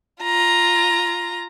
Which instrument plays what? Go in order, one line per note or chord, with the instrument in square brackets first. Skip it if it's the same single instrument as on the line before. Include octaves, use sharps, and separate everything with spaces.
[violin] F4 A#5